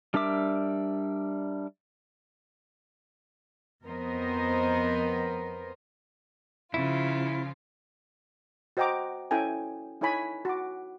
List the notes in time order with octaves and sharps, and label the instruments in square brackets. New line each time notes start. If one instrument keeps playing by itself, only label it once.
[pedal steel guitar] G3 D4 A#4 E5 D6
[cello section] F2 B3 A#4 C5 D#5
[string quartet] C#3 F3 F4 [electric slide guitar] E4
[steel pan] F#4 C5 D#5 G5 A#5 D6
C#4 E4 A4 G5 G#5
D#4 E4 A4 C#5 G#5 B5
F#4 D6